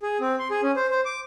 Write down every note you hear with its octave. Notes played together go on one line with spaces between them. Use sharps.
G#4
C4
C6
G#4
C#4
C5
C5
D6